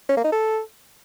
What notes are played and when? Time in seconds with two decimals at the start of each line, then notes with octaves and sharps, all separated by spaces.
0.09 C#4
0.17 A#3
0.24 D#4
0.32 A4